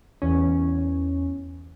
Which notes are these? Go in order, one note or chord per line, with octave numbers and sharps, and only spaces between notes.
E2 C#4